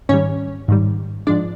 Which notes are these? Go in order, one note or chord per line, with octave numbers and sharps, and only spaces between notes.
G#2 D#3 G3 C#4 C#5
G#2 D#3 G3
G#2 F3 G#3 D4 D5